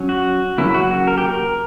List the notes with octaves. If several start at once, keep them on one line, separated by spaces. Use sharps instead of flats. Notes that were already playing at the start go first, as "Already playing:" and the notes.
Already playing: F#3 C#4
F#4
C#3 F#3 A#3 C#4 E4
F#4
F#4
A#4
G4
A#4